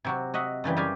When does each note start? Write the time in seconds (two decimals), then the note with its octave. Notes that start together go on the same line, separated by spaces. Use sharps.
0.04 C3 F#3 F#4
0.34 F#4 D#5 E5 F#5
0.64 F#2 C#3 E3 G3
0.76 F#2 G3 G4 F5 G#5